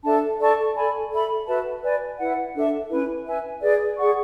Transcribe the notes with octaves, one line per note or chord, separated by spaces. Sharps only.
D4 A4 E5 A5
A4 D5 A5 C#6
A4 D5 G#5 B5
A4 E5 B5
F#4 B4 E5 A5
B4 D5 G#5
E4 B4 F#5
D4 A4 E5
C#4 E4 B4
B4 E5 G#5
G#4 B4 D5
G#4 D5 F#5 C#6